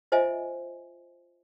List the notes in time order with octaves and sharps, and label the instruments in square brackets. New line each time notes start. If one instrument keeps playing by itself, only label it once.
[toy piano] F4 C5 D#5 E5 G#5